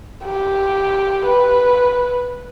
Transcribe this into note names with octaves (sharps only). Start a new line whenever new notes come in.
G4
B4